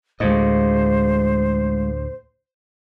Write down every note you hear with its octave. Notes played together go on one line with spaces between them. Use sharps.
D2 A2 G#3 F4 C5 D#5